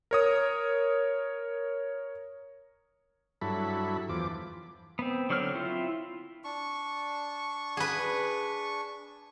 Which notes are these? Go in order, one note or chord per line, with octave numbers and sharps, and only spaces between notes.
A#4 C#5 D#6
G2 F#3 E4 A4 B5
E2 F3 D6
B3 C4
D3 F#3 C4 C#5 F6
C4 E4 F4
D4 C#6
G#4 B4